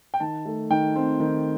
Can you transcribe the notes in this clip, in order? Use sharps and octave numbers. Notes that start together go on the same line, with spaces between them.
G5
D#3 A5
A3
D#3 G5
C4
D#3